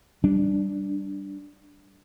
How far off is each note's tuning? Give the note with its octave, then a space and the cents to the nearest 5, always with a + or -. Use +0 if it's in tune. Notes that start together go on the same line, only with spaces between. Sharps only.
G3 -10 D4 +0